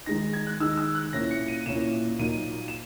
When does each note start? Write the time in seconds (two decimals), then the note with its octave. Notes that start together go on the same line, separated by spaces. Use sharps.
0.06 D#3 G#3 D#4 A#6
0.33 G#6
0.47 F#6
0.60 D#3 G#3 D#4 E6
0.77 E6
0.95 F#6
1.13 A#2 A#3 C#4 E4 A#6
1.31 C#7
1.48 D#7
1.66 A#2 A#3 C#4 E4 E7
2.19 A#2 F#3 A#3 D#4 D#7
2.68 E7